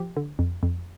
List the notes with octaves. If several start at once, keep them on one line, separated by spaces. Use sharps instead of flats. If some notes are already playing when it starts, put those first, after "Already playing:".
Already playing: F3 G4
D3
F2
F2